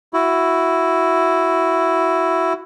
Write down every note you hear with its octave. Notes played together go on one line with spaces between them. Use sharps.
E4 F#4